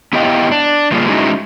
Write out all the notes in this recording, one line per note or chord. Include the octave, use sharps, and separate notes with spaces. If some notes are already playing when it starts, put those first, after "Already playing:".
B3 E4 G4 D#5 F5 G5
D4
D3 G3 A#3 F4 G#4
G#3 C#4 D#4 E4 F#4 G#4